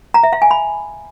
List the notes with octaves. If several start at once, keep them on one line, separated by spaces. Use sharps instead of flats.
A#5
E5
F5
G#5
B5